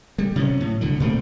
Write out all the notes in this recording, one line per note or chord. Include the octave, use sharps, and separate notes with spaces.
G3
C3 F#3 C#4
A2
C2 D3 F#3
A#2 A3 A#3 C4